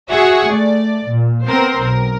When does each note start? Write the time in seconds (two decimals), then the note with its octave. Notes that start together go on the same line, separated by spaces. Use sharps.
0.11 F#4 G#4 E5 F#5 C#6
0.50 A3 D5
1.08 A#2
1.47 B3 C4 A#4 C5
1.80 B1 A#4